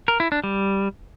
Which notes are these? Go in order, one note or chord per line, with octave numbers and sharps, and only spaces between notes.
A#4
E4
D4
G3